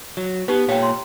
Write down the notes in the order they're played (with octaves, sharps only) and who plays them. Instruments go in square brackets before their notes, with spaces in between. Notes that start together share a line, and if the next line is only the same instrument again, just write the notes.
[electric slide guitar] F#3
[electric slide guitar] B3 [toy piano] D#4 G4 B4
[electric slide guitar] A#2 C#5 [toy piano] F5 G5
[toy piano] A#5 C6